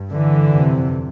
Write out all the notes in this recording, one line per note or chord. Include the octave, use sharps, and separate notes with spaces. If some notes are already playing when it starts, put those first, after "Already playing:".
Already playing: G2
D3 E3
F2 C3